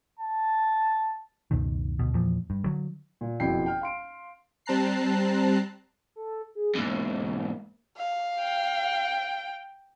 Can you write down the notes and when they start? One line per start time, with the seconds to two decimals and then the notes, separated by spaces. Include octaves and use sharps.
0.19 A5
1.51 C#2 F#2 B2 D#3
1.99 D2 B2
2.13 E2 A#2 F3
2.50 G2
2.64 D3 F#3
3.21 A#2
3.40 F#1 F2 B2 E4 G5 C7
3.66 G5 F6
3.82 F5 C6 D7
4.66 G3 C4 A5 A#5 F#6 C7
6.16 A4
6.55 G#4
6.75 E2 G#2 A#3
7.97 F5
8.40 G5